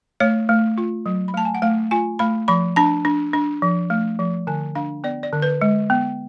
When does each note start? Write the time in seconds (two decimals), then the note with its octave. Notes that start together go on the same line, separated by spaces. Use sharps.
0.20 A3 C#5
0.49 A3
0.78 F4
1.06 F#3
1.28 B5
1.34 A3 A5
1.45 G#5
1.55 F#5
1.62 A3 F5
1.91 F4 G#5
2.19 A3 B5
2.48 F3 B5
2.76 D4 A5
3.05 D4
3.33 D4
3.62 F3
3.90 A3
4.19 F3
4.47 D3 G#5
4.75 D4 F5
5.04 B3 D5
5.23 D5
5.33 D3
5.42 B4
5.61 G#3
5.90 B3